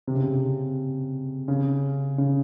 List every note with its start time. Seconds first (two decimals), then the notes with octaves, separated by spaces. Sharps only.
0.07 C3
0.15 C#3
0.22 C3
1.48 C#3
2.18 C#3